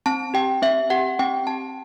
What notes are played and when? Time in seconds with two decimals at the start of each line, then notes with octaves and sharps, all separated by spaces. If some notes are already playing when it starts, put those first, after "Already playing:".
0.06 C4 A5
0.34 G4 G5
0.62 C4 E5
0.90 G4 F#5
1.19 C4 G5
1.47 G4 A5